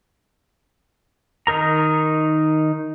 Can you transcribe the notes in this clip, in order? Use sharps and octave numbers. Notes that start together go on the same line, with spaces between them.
D#3 D#4 A#4 A#5